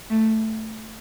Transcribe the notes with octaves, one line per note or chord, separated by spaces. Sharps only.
A3